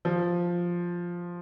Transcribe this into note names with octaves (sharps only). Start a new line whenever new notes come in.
F3